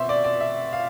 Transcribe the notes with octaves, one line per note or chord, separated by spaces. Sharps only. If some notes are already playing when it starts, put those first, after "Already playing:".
Already playing: B2 C4 E5 C6
D5
D5
E5
F5